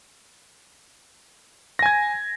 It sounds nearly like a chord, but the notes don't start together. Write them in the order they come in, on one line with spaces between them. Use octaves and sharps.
A#6 G#5 G#6